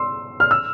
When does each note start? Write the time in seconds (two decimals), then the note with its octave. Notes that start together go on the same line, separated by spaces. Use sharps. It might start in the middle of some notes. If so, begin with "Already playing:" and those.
Already playing: C6 E6
0.40 F6
0.51 E6